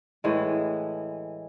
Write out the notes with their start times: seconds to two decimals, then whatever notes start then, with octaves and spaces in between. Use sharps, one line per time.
0.24 A2 E3 G#3